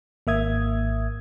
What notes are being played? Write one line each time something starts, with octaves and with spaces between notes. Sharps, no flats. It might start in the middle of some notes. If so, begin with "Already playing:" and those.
G#1 A#3 E5 D#6 G#6